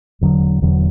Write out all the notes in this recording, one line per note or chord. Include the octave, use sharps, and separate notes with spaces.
E1 E2 D3 F#3
E1 E2 D3 F#3